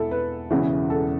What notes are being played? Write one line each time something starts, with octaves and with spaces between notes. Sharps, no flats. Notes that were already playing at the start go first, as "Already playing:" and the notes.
Already playing: E1 E2 E4 A4
B4
E1 E2 C#3 E3
A4